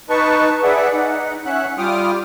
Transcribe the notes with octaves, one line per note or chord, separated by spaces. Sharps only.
D#4 B4 A5 C#6
G#4 B4 D5 E5 F#5
D#4 F#5
C#4 E5 F#5 F#6
G3 F4 G5 D6 D#6 F6